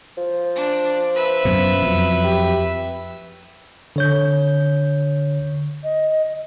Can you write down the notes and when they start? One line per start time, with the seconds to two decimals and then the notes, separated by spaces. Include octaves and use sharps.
0.17 F3
0.56 D4
1.15 B4 E5
1.45 F#2 B2
1.82 F2 F#3
2.24 G4
3.96 D3 C#5 G6
5.84 D#5